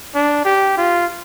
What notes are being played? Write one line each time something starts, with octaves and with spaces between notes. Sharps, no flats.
D4
G4
F4